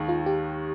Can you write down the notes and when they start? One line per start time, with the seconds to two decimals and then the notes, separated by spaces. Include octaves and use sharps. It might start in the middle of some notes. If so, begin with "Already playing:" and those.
Already playing: D#2 D#3 G#3
0.09 F4
0.26 G4